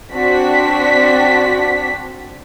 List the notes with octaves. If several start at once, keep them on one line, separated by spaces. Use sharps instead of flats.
C4 D4 F#4 B6